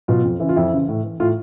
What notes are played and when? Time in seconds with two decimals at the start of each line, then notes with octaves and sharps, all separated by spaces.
0.08 B2 F#3 F4
0.24 F2
0.40 C#3 E3
0.49 F4
0.56 F2 E4
0.72 C#3 E3
0.88 A2
1.04 E3
1.20 A2 F4